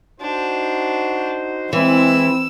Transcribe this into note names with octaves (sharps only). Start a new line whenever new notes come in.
D4 D#4 F#4 C5
E3 G#3 C4 E4 E6